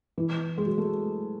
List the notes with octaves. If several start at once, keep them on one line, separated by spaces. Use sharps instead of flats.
E3
G#3
F#3
A3